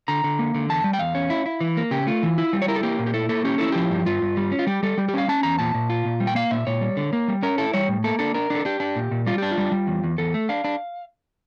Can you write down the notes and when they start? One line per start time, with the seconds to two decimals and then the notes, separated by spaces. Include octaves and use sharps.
0.08 D3 A#5
0.24 D3
0.39 A#3
0.55 D3
0.69 E2 A5
0.84 G3
0.93 G5
0.99 E2 F5
1.15 C#4
1.30 E4
1.46 E4
1.61 E3
1.77 A#3
1.91 C#3 G4
2.07 A3 F4
2.23 E3
2.38 E4
2.53 G3
2.62 C#5
2.68 E4 A#4
2.76 A4
2.83 A#3 G4
2.99 A#2
3.07 G4
3.14 E4 A4
3.29 A#3 A4
3.44 C#4 G4
3.58 E4 A4
3.72 F3 G4
3.91 G2
4.06 G2 F4
4.22 G2
4.37 G3
4.52 C#4
4.59 F4
4.67 G3 G4
4.83 G3 A4
4.98 G3 G4
5.09 G4
5.14 C#4 F5
5.28 C#4 A5
5.43 E2 A#5
5.58 A#2 A5
5.74 A#2
5.90 F4
6.06 A#2
6.20 G3
6.27 G5
6.35 A#3 F5
6.51 A#2 E5
6.67 A#2 C#5
6.81 G3
6.97 D3
7.13 A#3
7.28 G3
7.43 C#4 A#4
7.58 E4 A4
7.73 G3 C#5
7.88 A2
8.04 A#3 A4
8.19 D4 A4
8.34 D4 A#4
8.50 D4 A4
8.65 D4 G4
8.80 D4
8.96 A#2
9.11 A#2
9.26 G3 F4
9.38 D4 G4
9.51 F4
9.58 G3
9.72 G3
9.87 E2
10.04 E2
10.18 E2 A4
10.34 A3
10.49 D4 F5
10.64 D4